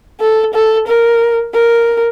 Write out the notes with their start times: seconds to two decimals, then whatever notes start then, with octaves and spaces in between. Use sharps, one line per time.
0.21 A4
0.54 A4
0.88 A#4
1.54 A#4